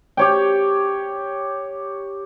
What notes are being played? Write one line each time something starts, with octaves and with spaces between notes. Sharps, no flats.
G4 C#5 G5